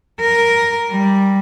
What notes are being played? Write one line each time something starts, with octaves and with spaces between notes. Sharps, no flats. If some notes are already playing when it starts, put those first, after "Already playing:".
A#4
G3